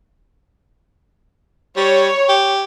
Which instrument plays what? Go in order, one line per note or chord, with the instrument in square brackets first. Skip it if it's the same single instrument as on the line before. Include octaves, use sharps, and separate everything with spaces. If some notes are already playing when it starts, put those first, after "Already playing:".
[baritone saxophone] G3 [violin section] C#5
[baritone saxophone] G4